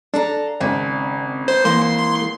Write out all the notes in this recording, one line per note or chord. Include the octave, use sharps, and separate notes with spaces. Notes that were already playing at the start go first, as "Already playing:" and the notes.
D4 A4 F5 A#5
G#1 C#3 C4
B3 C5
E3 A#3 C5 C6